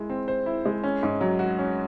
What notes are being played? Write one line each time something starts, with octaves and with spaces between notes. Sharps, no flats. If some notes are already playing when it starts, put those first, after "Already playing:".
Already playing: G#3 E4
C4
C5
E4
G#3
C#4
G#2
F#3
F#4
C#4